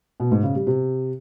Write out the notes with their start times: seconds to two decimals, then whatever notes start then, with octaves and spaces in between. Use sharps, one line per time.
0.20 B2
0.31 G#2
0.43 C#3
0.55 G3
0.67 C3